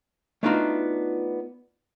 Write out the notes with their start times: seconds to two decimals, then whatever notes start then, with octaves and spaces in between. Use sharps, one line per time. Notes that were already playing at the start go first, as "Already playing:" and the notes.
0.43 A3 B3 D4 D#4 F4 F#4